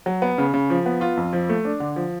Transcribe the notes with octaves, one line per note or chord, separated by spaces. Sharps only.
F#3
B3
C#3
C#3
F3
B3
F4
F2
F3
A3
D4
D3
F3